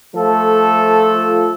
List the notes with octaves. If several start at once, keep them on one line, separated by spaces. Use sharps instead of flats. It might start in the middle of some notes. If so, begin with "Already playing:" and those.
F3 A3 F4 A4